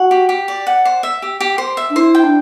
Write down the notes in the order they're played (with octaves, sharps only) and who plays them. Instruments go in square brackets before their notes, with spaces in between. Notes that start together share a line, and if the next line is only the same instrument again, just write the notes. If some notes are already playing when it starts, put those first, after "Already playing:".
Already playing: [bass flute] F#4 [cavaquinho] F#5
[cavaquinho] G4
G4
D5
F#5
C5
E5
G4
G4
C5
E5
[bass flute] D4
[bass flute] E4 [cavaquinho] C5
[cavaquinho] G5
[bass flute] D4